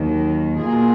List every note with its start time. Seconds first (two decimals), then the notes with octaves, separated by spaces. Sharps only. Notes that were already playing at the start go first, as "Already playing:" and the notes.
Already playing: D#2 D#3 F#3 A#3
0.60 B2 A#3 F4 G#4